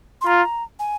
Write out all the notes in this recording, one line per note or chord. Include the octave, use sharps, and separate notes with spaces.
C6
F4 A#5
G#5